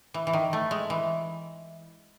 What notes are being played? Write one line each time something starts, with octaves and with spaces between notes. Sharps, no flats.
E3
E3
D#3
A3
G#3
E3